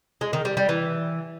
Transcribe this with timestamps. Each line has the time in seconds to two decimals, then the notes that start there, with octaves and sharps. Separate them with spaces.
0.21 G#3
0.33 D#3
0.45 G3
0.57 G3
0.69 E3